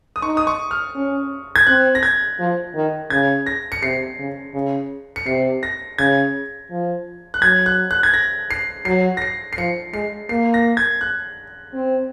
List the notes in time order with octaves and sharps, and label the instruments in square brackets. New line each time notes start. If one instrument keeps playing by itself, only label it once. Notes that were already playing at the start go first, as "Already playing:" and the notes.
[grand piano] D#6
[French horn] D#4 [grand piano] C#6
[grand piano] D#6
C#6
F6
[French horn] C#4
[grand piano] G#6
[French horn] C4 [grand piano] F#6
[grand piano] A#6
G#6
[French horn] F3
D#3
[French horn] C#3 [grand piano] G#6
[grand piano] A#6
C#7
[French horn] C3 [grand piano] C7
[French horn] C#3
C#3
[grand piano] C#7
[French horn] C3 [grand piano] C7
[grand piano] A#6
[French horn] C#3 [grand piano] G#6
[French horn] F3
[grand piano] F#6
[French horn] F#3 [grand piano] G#6
[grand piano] F#6
F#6
G#6
A#6
C7
[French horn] F#3 [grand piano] C7
[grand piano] A#6
C7
C7
[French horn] F3 [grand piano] C#7
[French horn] G#3 [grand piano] C7
[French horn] A#3 [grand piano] C7
[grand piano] A#6
G#6
F#6
[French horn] C4